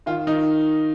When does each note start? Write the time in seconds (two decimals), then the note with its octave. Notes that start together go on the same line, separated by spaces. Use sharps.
0.06 D#3 F4
0.27 D#3 D#4